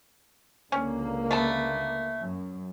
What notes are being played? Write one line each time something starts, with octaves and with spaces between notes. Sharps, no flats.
C#2 D3 A#3 C#4
A3 B3 A5
F#2